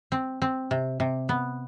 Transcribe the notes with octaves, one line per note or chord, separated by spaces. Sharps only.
C4
C4
C3
C3
B3